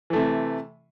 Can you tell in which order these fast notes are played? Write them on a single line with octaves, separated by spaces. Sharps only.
E3 A3 C3